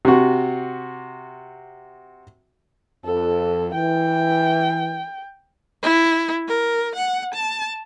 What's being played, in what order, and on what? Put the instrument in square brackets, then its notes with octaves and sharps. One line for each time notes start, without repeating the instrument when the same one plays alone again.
[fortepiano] C3 F#4
[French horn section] F2 [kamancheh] A4
[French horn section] E3 [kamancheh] G5
[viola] E4
A#4
F#5
A5